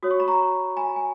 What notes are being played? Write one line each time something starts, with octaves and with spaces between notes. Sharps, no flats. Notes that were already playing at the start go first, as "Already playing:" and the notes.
F#4 C#5 D#6
C#6
B5
A#5 C#6
G#5 B5
G#5